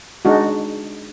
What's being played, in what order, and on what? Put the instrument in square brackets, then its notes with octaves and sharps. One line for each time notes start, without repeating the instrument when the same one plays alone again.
[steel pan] G#3 D4 D#4 F#4